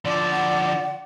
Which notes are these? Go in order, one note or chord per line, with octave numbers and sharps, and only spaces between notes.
D3 F3 D5
F#5